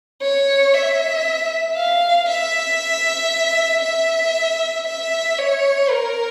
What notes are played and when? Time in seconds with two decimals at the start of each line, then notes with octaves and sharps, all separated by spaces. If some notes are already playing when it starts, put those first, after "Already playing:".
0.22 C#5
0.74 E5
1.77 F5
2.28 E5
3.83 E5
4.87 E5
5.38 C#5
5.90 A#4